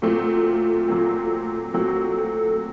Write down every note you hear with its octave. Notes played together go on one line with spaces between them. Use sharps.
A#2 F#3 A3 C4 F4
A#2 F#3 A3 C4
A#2 F#3 A3 C4 F#4
A4